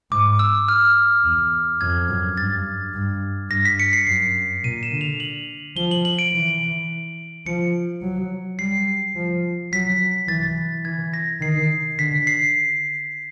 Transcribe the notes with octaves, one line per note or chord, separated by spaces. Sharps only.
G#2 D6
E6
F6
E2
F2 G#6
F#2
G2 A6
G2
G2 A#6
B6
C#7
C7
F#2 C#7
A#2 D#7
E7
D3
F7
F#7
F3 G7
F#7
F#7
D7
E3
F3 C#7
F#3
G3 C7
F3
F#3 B6
E3 A6
E3 G#6
A#6
D#3 C7
D3 B6
C7